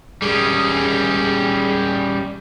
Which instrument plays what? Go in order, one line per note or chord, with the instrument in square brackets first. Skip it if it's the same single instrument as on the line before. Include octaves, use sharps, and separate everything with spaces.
[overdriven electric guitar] G3 C#4 [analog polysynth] G#4